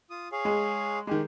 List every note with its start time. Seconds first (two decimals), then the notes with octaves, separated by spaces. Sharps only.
0.10 F4 D#6
0.32 G#4 C#5 F5
0.45 G#3
1.07 D#3 G#3 G4